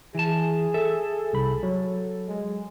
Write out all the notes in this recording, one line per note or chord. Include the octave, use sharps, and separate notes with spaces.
E3 G#4 A5
A4 E5
C2 B5
F#3
G#3